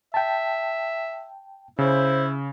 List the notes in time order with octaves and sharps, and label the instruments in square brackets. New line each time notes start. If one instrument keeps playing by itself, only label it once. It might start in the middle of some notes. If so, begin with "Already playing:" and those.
[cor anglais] E5 [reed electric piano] G5 A5
[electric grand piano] C#3 [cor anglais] E4 [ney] C5